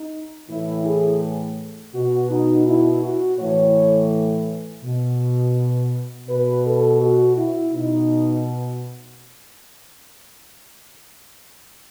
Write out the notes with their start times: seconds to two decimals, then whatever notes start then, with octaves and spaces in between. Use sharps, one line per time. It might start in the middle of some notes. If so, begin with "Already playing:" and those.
Already playing: D#4
0.49 A2 E3 E4
0.85 G#4
1.94 B2 F#4
2.30 D#4
2.66 E4
3.02 F#4
3.38 A2 E3 C#5
4.84 B2
6.28 B2 B4
6.66 A4
7.01 F#4
7.37 E4
7.73 B2 D#4